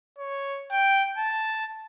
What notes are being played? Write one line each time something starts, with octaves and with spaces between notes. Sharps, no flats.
C#5
G5
A5